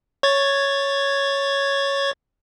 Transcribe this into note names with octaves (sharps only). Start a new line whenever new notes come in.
C#5 G#6 A6